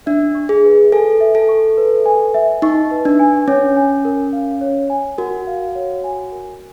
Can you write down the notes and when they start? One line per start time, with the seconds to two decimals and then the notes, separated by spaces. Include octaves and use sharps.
0.06 D4 E5
0.35 C#6
0.49 G#4
0.64 B4
0.92 A4 G#5
1.20 E5
1.35 A4
1.49 C#6
1.77 B4
2.06 G#5
2.34 E5
2.62 D#4 C#6
2.91 B4
3.05 D4
3.19 G#5
3.48 C#4 C#5
3.77 G#5
4.05 A#4
4.33 F5
4.61 C#5
4.90 G#5
5.18 F#4 A#4
5.47 F5
5.75 C#5
6.04 G#5
6.32 A#4